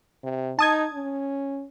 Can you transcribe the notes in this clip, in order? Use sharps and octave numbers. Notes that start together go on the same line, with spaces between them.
C3
D#4 A5 D#6 G#6
C#4